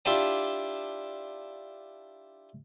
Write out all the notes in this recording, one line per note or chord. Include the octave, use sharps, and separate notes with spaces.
D4 E4 F4 G4 D5 A5